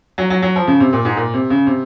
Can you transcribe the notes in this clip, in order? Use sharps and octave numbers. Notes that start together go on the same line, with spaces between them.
F#3
F#3
F#3
F3
C#3
C3
A#2
G#2
A#2
C3
C#3
C3